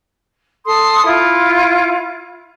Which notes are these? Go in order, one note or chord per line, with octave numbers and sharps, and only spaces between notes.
A4 C6 D#6
E4 F4